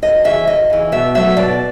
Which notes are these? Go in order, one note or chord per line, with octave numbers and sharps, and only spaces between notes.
D2 D#5
C#3 E3 E5
D2 D#5
C#3 E3
B2 E5
F#3 A3 E5
B2 D5